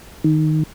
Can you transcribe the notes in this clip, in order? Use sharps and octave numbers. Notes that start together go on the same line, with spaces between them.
D#3